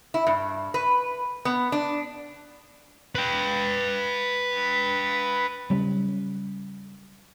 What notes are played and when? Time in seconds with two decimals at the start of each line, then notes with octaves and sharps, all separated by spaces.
0.14 E4
0.27 G2
0.74 B4
1.45 B3
1.72 D4
3.15 B4 G5
5.70 C#3 F#3 G3 C#4